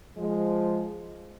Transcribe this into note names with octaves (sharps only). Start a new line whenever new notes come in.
F3 G#3